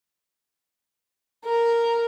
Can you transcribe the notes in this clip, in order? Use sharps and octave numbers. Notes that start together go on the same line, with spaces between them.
A#4